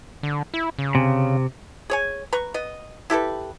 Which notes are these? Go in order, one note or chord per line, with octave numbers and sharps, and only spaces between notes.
D3
E4
C#3
C3
G#4 C#5 G#5
B4 A#5 C#6
B3 D#5
E4 G4 A4 B4